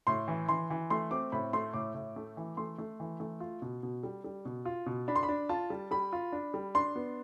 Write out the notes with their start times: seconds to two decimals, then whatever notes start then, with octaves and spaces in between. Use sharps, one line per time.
0.07 A2 C6
0.28 E3
0.49 E3 C6
0.70 E3
0.90 A3 C6
1.11 C4 D6
1.32 A2 B5
1.53 A3 C6
1.73 A2 D6
1.94 A2
2.16 A3
2.37 E3
2.57 A3 C6
2.78 A3
3.00 E3
3.20 A3
3.40 F4
3.62 B2
3.83 B2
4.03 G3
4.24 G3
4.45 B2
4.65 F4
4.86 B2
5.08 D4 B5
5.16 C6
5.23 B5
5.29 D4
5.49 F4 A5
5.70 G3
5.91 G3 B5
6.13 F4
6.32 D4
6.54 G3
6.75 D4 C6
6.96 B3